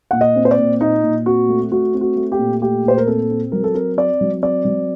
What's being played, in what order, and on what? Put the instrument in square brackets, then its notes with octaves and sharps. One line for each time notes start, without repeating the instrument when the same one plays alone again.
[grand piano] A#2 F#5
D#5
C4
C5
D5
A#2
A#2 D#4
A#2
C4 F#4
A3
A3 F#4
C4
F#4
A3
G4
A#2
A3 G4
A#2 C5
A#4
C4 A4
C4
F#3 A#4
A4
C4 A#4
C4 D5
F#3
C4 D5
F#3